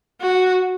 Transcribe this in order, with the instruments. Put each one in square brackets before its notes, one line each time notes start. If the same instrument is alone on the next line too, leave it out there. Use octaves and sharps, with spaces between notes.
[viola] F#4